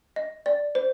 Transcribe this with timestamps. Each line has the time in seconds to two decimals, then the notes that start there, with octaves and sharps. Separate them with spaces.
0.16 D#5
0.46 D5
0.75 C5